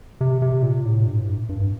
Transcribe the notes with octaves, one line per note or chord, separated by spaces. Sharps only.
C3
C3
A#2
A2
G2
G2